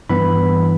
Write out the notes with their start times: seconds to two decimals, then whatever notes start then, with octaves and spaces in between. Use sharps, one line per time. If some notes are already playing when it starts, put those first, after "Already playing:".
0.09 G2 E3 B3 B5